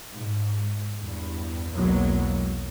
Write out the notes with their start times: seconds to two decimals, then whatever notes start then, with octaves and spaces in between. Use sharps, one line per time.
0.12 G#2
1.01 E2 G2
1.71 B1 E2 F#3 G#3 A#3